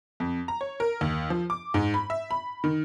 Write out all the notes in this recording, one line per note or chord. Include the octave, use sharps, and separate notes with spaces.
F2
A#5
C#5
A#4
D#2
F3
D6
G#2
B5
E5
B5
D#3